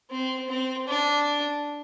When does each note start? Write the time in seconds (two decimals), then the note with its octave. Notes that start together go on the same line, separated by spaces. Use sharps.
0.11 C4
0.50 C4
0.88 D4